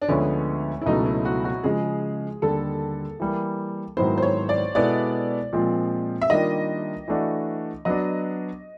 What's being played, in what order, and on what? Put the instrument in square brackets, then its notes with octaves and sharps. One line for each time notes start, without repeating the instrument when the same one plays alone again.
[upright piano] D4
[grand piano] D2 D3 F3 G#3 B3 [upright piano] C#4
[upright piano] E4
[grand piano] C#2 B2 F#3 A3 [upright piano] D#4
[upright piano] E4
F#4
F#4
[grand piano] C#3 F3 G#3 [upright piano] G#4
[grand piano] D#2 D3 G3 [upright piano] A4
[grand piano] E3 G3 A#3
[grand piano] G#2 D#3 F#3 B3 E4 [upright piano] C5
[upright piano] C5
C#5
D5
[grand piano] B2 G#3 B3 E4 A4 [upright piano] D5
[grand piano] A#2 F3 G#3 C4 F4
[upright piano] E5
[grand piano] D#3 G3 A#3 D4 F4 [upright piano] D#5
[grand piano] E3 A3 D4 F#4
[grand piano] F#3 B3 D4 [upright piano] D#5